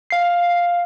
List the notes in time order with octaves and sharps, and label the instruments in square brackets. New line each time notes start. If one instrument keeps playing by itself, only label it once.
[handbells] F5 C7